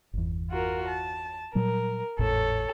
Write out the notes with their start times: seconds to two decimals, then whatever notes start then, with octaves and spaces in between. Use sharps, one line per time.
0.14 G1 E2
0.50 F4 F#4 A#4
0.87 A5
1.55 A#2 F#3 G3 A#4
2.19 G#1 E2 A2 A4 C#5